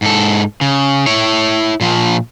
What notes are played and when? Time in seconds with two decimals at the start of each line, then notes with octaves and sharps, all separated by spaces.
0.02 G#2 A4
0.61 C#3
1.06 E4 C#5
1.81 A#2 F3